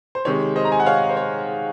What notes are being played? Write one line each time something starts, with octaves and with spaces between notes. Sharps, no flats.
C5
C3 D#3 G#3 C#5
C5 D#5
A#5
G#5
F#5
C#5 F5
C5
C#5